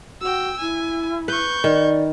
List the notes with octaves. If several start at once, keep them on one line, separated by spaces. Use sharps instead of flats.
F#4 G5 E6
E4 G#5
B4 C#6 G6
D#3 D5